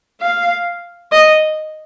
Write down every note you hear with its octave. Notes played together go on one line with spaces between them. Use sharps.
F5
D#5